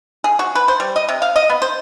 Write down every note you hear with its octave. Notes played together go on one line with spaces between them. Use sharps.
G#4
F#4
B4
C5
G3
D#5
C3
F5
D#5
B3
C5